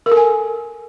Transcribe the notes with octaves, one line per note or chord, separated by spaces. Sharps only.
A#4
A4
G#5